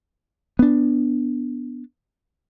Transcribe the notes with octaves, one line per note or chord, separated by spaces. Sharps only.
B3 D4